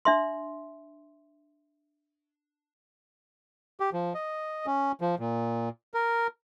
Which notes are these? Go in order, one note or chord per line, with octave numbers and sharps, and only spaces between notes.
D4 E5 C6
G4
F3
D#5
C#4
F3
A#2
A#4